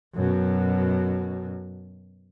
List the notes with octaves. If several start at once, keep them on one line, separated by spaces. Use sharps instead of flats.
F#2 B2